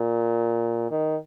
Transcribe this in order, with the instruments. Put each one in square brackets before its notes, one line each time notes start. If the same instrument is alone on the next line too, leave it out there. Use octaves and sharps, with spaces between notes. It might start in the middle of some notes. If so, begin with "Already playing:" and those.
Already playing: [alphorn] A#2
D#3